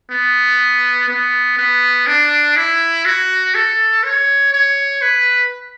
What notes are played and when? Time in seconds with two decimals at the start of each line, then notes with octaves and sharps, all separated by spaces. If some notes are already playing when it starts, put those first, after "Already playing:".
0.11 B3
1.08 B3
1.57 B3
2.07 D4
2.56 E4
3.05 F#4
3.55 A4
4.04 C#5
4.53 C#5
5.02 B4